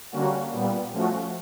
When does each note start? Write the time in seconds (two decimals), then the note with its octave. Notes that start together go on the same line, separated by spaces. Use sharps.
0.11 D3 G3 A#3 C#4 F#4
0.51 A#2 G3 B3
0.92 F3 A3 C#4 F#4